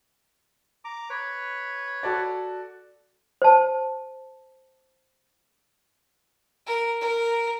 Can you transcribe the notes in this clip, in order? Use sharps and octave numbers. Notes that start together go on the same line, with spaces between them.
A#5 D6
B4 C#5
F#4 A4 D5
C5 A5
A#4
A#4